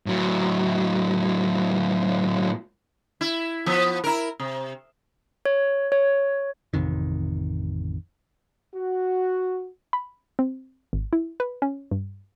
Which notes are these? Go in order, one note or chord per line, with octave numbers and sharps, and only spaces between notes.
A2 F#3
E4
F3 B3
E4 A#4
C3
C#5
C#5
A1 F2 C3 D#3
F#4
B5
C4
G#1
E4
B4
C#4
G2